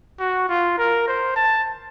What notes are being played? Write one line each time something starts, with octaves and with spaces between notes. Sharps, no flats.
F#4
F4
A#4
C5
A5